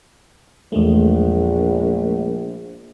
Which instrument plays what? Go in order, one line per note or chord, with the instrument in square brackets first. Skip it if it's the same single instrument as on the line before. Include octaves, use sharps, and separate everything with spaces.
[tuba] A#1 [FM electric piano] E2 G#3 A3